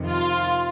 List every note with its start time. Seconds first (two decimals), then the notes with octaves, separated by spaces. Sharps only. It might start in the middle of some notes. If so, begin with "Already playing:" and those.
Already playing: F2 C3 D#3
0.09 F4